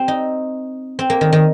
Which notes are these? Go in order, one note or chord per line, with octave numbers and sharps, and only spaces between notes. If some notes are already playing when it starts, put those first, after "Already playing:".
Already playing: C4 G4
D#4
C4
A#3
D#3
D#3